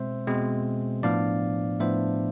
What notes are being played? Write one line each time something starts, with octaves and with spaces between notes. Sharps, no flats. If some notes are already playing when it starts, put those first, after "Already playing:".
Already playing: B2 G#3 C4 C5 E5
B2 G#3 C4
A2 F3 B3 D4 D5 F5
A2 F3 B3 D4 C5 E5